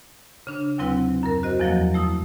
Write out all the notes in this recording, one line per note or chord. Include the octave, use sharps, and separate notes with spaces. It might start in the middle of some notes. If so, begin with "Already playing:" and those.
C#3 D4
D#2 C3 F#3 C4 E4 B4
F#2 A#4
F#4 C5 D#5
E2 F3 F#3 A#3
A3 E4 D#6